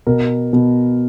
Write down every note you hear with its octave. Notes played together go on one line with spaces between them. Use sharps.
B2 A#4
B2